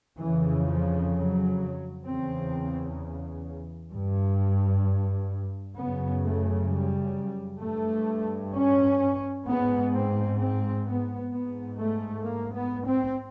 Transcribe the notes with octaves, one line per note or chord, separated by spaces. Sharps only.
F2 C#3 E3
F3
F#3
E2 C#3 C4
G2
F#2 C#3 B3
A3
G3
G2 A3
C#4
G#2 B3
C4
C4
B3
G#2 B3
A3
A#3
B3
C4